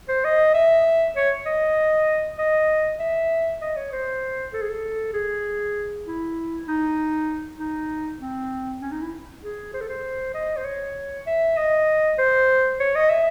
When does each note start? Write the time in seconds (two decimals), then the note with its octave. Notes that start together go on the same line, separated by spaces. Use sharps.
0.09 C5
0.25 D#5
0.54 E5
1.16 C#5
1.46 D#5
2.38 D#5
3.00 E5
3.61 D#5
3.77 C#5
3.92 C5
4.53 A4
4.62 G#4
4.69 A4
5.13 G#4
6.06 E4
6.68 D#4
7.59 D#4
8.21 C4
8.81 C#4
8.92 D#4
9.02 E4
9.43 G#4
9.74 C5
9.81 A4
9.89 C5
10.34 D#5
10.57 C5
10.65 C#5
11.27 E5
11.57 D#5
12.18 C5
12.80 C#5
12.95 D#5
13.10 E5